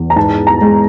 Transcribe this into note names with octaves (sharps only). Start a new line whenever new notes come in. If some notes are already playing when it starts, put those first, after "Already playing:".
Already playing: E2
A#5
G#2 A5
A#5
G#3